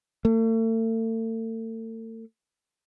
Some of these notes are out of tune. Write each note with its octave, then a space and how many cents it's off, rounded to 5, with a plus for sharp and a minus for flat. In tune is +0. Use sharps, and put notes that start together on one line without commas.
A3 +40